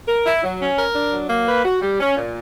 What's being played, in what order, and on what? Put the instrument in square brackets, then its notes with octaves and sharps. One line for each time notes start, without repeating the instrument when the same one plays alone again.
[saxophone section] A#4
E4
F#3
C#4
A#4
D4
F#3
A#3
B4
F#4
G3
C#4
A#2